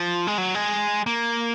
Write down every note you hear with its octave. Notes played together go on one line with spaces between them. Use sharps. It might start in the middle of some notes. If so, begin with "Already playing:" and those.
Already playing: F3
G#3
F#3
G#3
A#3